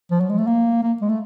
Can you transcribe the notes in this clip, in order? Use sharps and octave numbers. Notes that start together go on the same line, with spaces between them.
F3
F#3
G#3
A3
A#3
A#3
G#3
A3